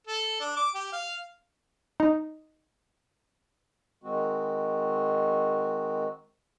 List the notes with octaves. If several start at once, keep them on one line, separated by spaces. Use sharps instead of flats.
A4
D4
D6
G4
F5
D#4
D#3 G#3 C4 F#4